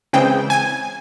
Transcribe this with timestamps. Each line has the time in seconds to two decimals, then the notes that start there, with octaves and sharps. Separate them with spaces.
0.13 C#3 E3 G#3 C4 G5
0.50 G#5